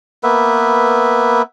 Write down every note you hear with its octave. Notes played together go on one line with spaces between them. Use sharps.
A#3 B3 B4 E5